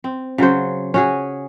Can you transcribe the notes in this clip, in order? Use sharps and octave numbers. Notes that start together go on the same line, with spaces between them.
C4
C#3 F#3 F#4 C5
C#4 F#4 G#4